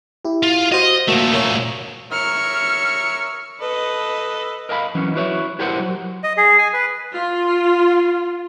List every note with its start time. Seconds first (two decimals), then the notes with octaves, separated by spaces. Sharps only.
0.25 E4 G4
0.43 F4
0.72 F#4 C5 D#5 D#6
1.08 A#2 A3 A#3 F#4
1.33 A#4 C#5 A#5
2.12 A#4 C#5 E5 F6 C#7
3.61 A4 B4 D#5
4.69 A#4 D#5 F5 G#5 B5
4.95 E3 F#3 C#4
5.15 E4 F#4 B4 C#5 D#5 E5
5.59 E4 G4 A#4 C5 D5 F#5
5.79 F#3
6.24 D#5
6.37 G#4
6.58 G#5
6.73 B4
7.13 F4